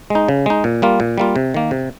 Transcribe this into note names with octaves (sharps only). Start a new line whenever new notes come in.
G#3 D#4
C#3
G#3 D#4
A#2
G3 A#3 F4
A#2
G3 A#3 F4
C3
D#3 A#3
C3